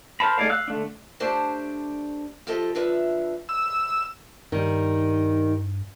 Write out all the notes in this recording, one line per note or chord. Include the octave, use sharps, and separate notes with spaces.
A#4 C5 A5 B5
A3 D#4 G#4 D5 F5
F5 E6 F#6
D3 A3 D4
A3 D4 G4 C5 D5 A5
F3 G4 A4 D#5
D3 F3 B4 E5
E6
G2 D#3 G3